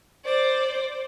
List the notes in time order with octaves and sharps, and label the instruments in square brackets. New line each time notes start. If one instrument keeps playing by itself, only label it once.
[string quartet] C5 D5